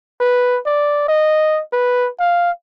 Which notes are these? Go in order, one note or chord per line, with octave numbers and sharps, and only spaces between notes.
B4
D5
D#5
B4
F5